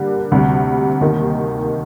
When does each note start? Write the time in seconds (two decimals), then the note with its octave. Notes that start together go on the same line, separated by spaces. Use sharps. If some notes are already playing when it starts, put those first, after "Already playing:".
Already playing: D3 G3 A#3
0.32 D2 C3 G3
1.01 D#2 D#3 A#3